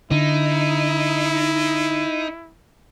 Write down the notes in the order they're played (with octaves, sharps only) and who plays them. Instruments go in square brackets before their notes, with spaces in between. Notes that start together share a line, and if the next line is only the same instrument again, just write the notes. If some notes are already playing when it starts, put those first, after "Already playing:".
[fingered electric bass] D3 [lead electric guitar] D#4 [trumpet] E4